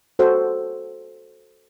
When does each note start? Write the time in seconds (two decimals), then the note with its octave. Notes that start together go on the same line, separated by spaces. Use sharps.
0.19 F#4 A4 C5